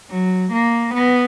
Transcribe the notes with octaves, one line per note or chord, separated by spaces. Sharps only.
F#3
A#3
B3